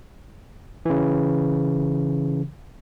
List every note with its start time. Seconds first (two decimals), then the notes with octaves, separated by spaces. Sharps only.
0.86 C#3 E3